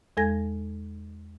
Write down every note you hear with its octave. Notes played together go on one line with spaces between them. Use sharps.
E2 G#3 A4 G#5 G#6 A#6